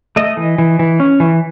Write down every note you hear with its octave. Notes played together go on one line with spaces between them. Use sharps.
A3 D#5
E3
E3
E3
C#4
E3